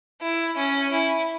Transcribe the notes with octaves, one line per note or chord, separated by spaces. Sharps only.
E4
C#4
E4